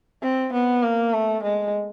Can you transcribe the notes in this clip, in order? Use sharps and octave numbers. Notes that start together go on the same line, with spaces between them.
C4
B3
A#3
A3
G#3